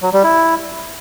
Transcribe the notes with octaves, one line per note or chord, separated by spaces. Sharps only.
F#3
G3
E4